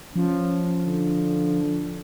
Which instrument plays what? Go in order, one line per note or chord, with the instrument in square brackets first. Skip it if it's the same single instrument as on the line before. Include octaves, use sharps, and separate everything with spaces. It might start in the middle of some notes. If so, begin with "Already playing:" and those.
[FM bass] F3 [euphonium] C#4
[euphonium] D3